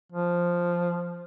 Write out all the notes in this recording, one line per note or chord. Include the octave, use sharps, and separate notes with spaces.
F3